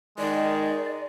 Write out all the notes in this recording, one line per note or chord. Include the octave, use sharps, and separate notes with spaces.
D#3 G#3 D5